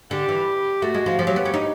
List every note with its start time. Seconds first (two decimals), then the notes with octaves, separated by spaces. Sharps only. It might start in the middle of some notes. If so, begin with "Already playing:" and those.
0.11 D3 G4
0.29 E3
0.82 A3 F#4
0.94 G#3
1.06 F3
1.19 F3 G4
1.27 F#3
1.36 B3
1.45 C#4
1.54 D#4